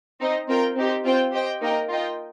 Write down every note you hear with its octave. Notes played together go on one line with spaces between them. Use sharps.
C4 D#4 C5 D#5
C4 F4 A#4 G5
C4 D#4 G4 C5
C4 F4 C5 G5
G4 C5 D#5 G5
A#3 D#4 A#4 D#5 G5
F4 A#4 D#5 G5